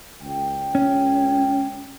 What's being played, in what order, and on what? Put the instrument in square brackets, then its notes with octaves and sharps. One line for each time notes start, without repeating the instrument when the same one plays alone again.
[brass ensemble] C#2 G5
[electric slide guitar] C#4